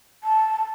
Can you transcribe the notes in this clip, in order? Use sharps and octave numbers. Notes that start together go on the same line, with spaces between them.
A5